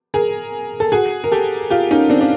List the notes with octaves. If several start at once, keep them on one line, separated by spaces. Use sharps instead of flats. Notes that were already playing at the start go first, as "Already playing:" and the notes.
G#4 A#4
A4
F#4 G#4
A#4
G4 A4
F4 G4
C#4 D#4
C4 D4
D4